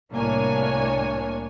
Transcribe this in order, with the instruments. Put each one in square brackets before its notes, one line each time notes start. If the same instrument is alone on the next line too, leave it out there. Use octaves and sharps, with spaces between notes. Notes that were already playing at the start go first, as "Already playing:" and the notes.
[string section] C2 A2 A#3 D4 C#5 G#5